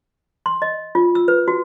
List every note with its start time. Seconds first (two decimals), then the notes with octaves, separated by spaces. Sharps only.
0.46 C6
0.62 D#5
0.95 F4
1.15 E6
1.28 B4
1.48 F#4